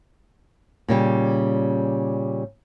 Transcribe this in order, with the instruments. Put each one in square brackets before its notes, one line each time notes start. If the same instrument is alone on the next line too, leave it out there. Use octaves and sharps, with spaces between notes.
[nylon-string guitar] A#2 C#3 G3